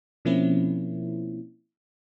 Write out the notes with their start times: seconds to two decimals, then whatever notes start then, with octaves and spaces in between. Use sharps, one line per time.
0.25 B2 F3 A#3 C4 C#4 E4